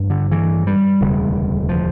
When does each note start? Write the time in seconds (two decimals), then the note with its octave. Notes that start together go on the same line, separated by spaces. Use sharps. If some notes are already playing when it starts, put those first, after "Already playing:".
Already playing: A1 G2
0.10 D3
0.32 E3
0.67 G3
1.01 E1 D2 C#3
1.69 F3